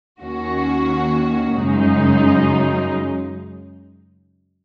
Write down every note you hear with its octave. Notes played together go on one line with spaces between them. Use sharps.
D#2 D#3 A#3 C#4 F#4
F#2 C#3 G#3 D#4